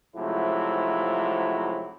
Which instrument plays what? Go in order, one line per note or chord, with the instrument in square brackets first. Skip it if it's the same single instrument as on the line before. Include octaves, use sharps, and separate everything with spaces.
[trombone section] G#2 C3 F3 F#3 A3 E4